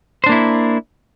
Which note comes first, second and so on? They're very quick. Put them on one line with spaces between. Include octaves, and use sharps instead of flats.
C5 D4 A#3 E4